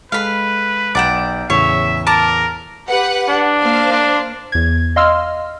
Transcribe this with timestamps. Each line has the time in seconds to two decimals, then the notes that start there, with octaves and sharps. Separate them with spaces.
0.12 G#3 A4 B4 F5 B5
0.95 B1 D5 F#5 G5 A#5 E7
1.50 E2 A2 C#3 C#5 E5
2.07 A#4 A5 A#5 D6
2.89 G4 B4 F#5
3.28 D4
3.61 A#3 C5 F5
3.92 D4
4.52 E2 G#6
4.96 D#5 F5 C6 E6 F6